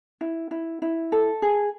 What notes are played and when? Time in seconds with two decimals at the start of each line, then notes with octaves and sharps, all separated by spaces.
0.21 E4
0.51 E4
0.82 E4
1.12 A4
1.42 G#4